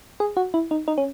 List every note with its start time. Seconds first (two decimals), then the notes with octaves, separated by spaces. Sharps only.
0.20 G#4
0.37 F#4
0.54 E4
0.71 D#4
0.88 D#4
0.98 C#4